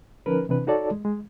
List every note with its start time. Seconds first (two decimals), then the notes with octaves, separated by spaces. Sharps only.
0.26 D3 F3 C#4 D#4 A#4 B4
0.49 C3 E3 C4 D4 B4
0.67 D#4 F#4 A4 C#5 D5 A5
0.91 G#3
1.05 G#3